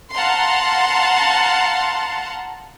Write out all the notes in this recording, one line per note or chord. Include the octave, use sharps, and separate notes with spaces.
F5 F#5 A5 A#5 C6